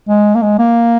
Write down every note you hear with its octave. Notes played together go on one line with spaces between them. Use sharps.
G#3
A#3
G#3
A#3